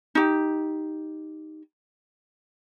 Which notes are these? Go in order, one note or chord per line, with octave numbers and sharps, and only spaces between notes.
D#4 G4